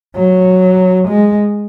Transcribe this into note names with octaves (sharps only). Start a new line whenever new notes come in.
F#3
G#3